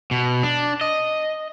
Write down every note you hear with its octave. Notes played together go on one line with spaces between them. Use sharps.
B2
D4
D#5